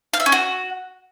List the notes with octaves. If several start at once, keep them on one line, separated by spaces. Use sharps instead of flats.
F5
E5
C#4
F#4